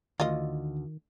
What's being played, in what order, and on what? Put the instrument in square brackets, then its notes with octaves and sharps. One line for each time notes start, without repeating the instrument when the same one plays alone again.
[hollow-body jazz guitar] D2 [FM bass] D#3 [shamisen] F4 D#5